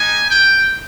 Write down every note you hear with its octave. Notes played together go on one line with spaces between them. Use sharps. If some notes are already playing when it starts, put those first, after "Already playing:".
Already playing: G#3 D#4 G4 G#5
G5